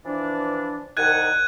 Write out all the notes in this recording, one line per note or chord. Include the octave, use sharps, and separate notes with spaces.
E3 F3 D4
C2 D#3 F#5 F#6 G#6 D#7